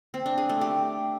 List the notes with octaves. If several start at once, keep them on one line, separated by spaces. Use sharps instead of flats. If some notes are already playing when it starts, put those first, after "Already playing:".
C4
D4
G#4
A3
G4